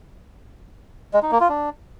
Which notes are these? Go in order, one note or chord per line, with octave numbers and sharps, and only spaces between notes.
G#3
D#4
A#3
F4
D4